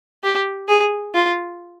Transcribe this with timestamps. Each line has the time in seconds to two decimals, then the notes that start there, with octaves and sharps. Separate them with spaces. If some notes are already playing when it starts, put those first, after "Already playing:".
0.23 G4
0.68 G#4
1.14 F4